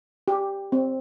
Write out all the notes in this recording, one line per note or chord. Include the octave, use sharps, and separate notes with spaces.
G4
C4